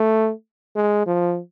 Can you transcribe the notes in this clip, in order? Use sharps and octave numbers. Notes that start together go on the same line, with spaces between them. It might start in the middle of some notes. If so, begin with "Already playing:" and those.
Already playing: A3
G#3
F3